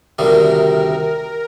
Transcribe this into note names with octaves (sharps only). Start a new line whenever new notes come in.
D2 C3 D#3 G3 A#4